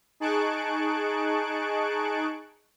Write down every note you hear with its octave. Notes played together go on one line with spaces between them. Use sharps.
D#4 G#4 A5 C#6 F#6 D7